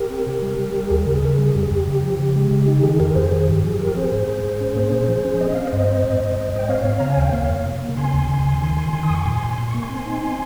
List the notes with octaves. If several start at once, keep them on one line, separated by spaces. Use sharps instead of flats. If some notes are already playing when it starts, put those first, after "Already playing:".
Already playing: G4 A#4
C4
C3
G3
G3
G3
D#2 G#4
C#3 A#4
G#4
C#3 A#4
G3 G#4
F2 G4
G#4
F2 G4
C#3
F3
C#3
G#3
C#3
D#4
D#3 G#4
F2 G4 A#4
F2 G#4 C5
D#3 G#4
G2 G4
F3 G#4
F3 G4 A#4
C4 G#4 C5
G#2
G#2
G#2
C#4
A#3
A#2
F3
C#4
C4 D#5
C4 F5
C5 D#5
G2
C4
G#2
G#2
G#2
G#2
G5
C4 C#5 F5
C4
C#3 A#5
G#5
D#2 G5
A#3 C#5 F5
F2
C3
A#3
C#3 G#5 C6
D#2
C#3
D#2
D#3
D#3
D#3
D#6
F2
C#6
A#2 G#5 C6
A#2
A#2 C6
A#3 C#6
G#5 C6
C4
D#4
C4